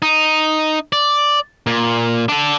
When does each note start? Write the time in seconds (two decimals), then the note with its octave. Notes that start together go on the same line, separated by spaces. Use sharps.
0.02 D#4
0.93 D5
1.67 A#2
2.29 D4 A4